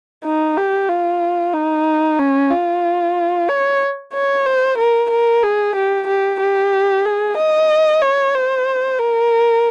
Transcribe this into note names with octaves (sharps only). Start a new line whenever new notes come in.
D#4
G4
F4
D#4
C#4
F4
C#5
C#5
C5
A#4
A#4
G#4
G4
G4
G4
G#4
D#5
C#5
C5
A#4